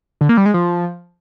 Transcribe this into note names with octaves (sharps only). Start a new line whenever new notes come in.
D3
A#3
G3
G#3
F3